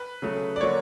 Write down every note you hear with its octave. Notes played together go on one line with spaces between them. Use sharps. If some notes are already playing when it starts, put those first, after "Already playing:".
Already playing: B4
C#3 F#3 A3
D5
D3 F#3 A#3 C#5